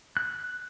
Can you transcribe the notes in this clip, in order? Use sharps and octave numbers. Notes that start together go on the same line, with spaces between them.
F#6